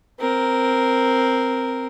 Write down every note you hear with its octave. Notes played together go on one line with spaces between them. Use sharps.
C4 A#4